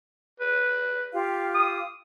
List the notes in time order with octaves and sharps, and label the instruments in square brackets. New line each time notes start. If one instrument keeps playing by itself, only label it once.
[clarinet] B4
[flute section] F4 G4 F5
[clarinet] D#6